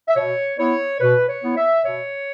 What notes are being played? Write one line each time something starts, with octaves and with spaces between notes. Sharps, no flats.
E5
B2 C#5
B3 E4 C#5
B2 B4
C#5
B3 E4
E5
B2 C#5